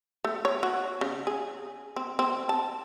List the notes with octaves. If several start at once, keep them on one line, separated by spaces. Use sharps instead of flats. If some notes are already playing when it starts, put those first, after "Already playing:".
A3
C#5
F#4
C#3
G#4
C4
C4
A5